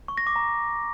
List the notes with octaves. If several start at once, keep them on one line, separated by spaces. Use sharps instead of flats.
C#6
A#6
D6
A#5